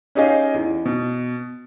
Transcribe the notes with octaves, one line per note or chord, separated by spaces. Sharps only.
C#4 D#4 G4 G#4 D#5 F5
E2
B2